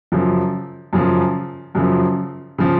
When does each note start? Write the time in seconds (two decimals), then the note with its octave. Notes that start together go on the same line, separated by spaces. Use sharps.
0.12 F#2 C#3 F3
0.93 F#2 C#3 F3
1.75 F#2 C#3 F3
2.58 C#3 F3